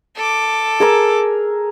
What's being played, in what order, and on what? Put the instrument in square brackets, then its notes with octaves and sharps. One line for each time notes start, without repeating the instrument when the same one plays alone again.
[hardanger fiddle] A4 D6
[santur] G#4 A#4 E6